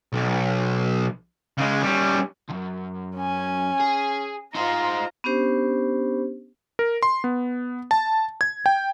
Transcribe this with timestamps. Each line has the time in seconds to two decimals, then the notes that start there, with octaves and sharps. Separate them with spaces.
0.13 B1
1.58 C#3 G#3
1.83 G3 C#4
2.49 C#2 F#2
3.16 C#4 G#5
3.80 G#4
4.55 D#4 F4 C5 A#5
5.24 B3 C#4 D4 G4 C5
6.79 A#4
7.03 C6
7.24 B3
7.91 A5
8.41 G#6
8.66 G5